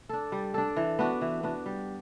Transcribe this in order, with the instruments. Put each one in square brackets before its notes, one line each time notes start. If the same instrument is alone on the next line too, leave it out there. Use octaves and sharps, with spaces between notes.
[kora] D4 A4
G3
D4 A4
E3
B3 D4 F#4
E3
B3 D4 F#4
G3